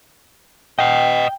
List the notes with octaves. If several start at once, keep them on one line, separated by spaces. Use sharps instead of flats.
D#5 F#5 G5